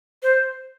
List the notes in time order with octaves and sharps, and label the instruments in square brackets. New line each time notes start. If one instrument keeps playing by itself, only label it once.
[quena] C5